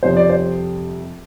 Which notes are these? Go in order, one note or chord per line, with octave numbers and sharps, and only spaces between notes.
F2 C3 G3 C4 C5
D5
C5